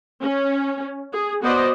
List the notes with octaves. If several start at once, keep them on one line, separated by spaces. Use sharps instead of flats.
C#4
G#4
B3 F#4 C5 D5 D#5